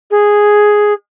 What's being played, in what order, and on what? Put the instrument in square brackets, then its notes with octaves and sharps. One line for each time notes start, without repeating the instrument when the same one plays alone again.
[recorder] G#4